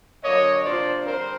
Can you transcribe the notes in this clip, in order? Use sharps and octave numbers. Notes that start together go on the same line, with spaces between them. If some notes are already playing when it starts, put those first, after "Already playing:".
D3 F#3 A#3 D4 C#5 D#5
C3 F3 A#3 D4 C5 D5
D3 G3 C4 A#4 C5